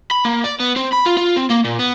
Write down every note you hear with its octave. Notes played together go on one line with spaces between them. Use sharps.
B5
A#3
D5
B3
C4
B5
F4
F4
C4
A#3
A#2
B3